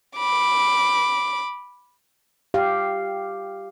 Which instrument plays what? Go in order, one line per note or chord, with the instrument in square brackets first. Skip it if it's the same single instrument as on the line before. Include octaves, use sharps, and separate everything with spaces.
[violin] B5 D6
[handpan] G4 F5